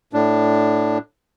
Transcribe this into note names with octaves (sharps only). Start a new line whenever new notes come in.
A2 D4